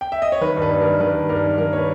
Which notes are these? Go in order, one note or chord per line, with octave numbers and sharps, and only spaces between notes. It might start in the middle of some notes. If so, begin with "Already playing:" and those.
G5
E5
D#5
C#5
D#3 B4
G2
B4
G2
D#3 A#4
D#3 B4
G2
G2 A#4
D#3
D#3 A#4
C#5
B4